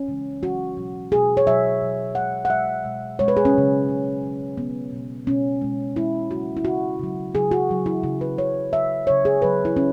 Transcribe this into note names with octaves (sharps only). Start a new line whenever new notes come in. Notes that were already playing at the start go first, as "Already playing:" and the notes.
Already playing: C#4
C#3 E3 G#3
C#3 E3 G#3 F#4
B2 F#3
B2 F#3 G#4
C#5
B2 F#3 E5
B2 F#3
B2 G#3 F#5
F#5
B2 G#3 E5
B2 G#3
B2 G#3 C#5
B4
G#4
C#4
C#3 F#3
C#3 F#3
C#3 F#3
C#3 F#3 B3
B2 G#3
B2 G#3 C#4
B2 G#3
B2 G#3 E4
C#3 F#3 F#4
E4
C#3 F#3 F#4
C#3 F#3
C#3 F#3 G#4
F#4
C#3 F#3
E4
C#3 F#3 E4
B4
C#3 F#3 C#5
C#3 F#3 E5
C#3 F#3 C#5
G#4
C#3 F#3 B4
E4
C#3 F#3 C#4